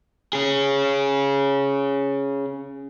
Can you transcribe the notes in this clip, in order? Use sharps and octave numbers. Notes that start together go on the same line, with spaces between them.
C#4 G#4